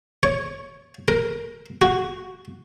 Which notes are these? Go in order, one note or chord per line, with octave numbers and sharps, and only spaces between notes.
C#5
A#4
F#4